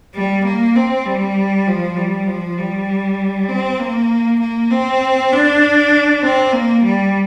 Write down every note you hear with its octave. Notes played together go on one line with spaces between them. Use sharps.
G3
A#3
C4
G3
F3
G3
F3
G3
C4
A#3
A#3
C4
D4
C4
A#3
G3